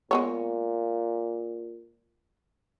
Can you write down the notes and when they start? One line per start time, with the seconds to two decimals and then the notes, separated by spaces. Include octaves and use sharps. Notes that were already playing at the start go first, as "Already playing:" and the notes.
0.11 A#2 G#3 B3 C#5